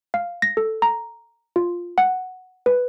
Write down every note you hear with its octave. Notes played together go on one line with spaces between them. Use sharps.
F5
A#6
A4
A#5
F4
F#5
B4